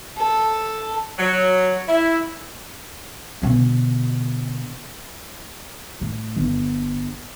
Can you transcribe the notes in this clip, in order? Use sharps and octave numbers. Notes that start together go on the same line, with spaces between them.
A4
F#3
E4
B2 D3
A2
G1